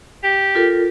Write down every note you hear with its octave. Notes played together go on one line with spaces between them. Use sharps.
G4
F4 A4 A#4